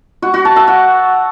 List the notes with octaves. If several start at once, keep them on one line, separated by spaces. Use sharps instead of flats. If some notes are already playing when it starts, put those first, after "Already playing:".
F#4
F#4
A5
E5
F#5